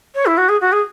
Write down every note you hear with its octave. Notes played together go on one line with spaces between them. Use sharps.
C#5
E4
F#4
G#4
F#4
G#4